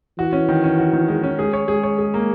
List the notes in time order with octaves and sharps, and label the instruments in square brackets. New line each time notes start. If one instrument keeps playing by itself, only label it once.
[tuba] E3 [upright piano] F#4
[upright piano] C#4
D#3
C#4
F#4
D#3
G#3
C#4
[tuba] G#3 [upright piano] G#4
[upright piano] C#5
[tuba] G#3 [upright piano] G#4
[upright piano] C#5
G#4
A#3